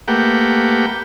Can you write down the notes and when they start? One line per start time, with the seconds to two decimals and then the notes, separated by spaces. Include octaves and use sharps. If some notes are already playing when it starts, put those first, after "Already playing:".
0.08 A3 A#3 G4 B4 F#5 G5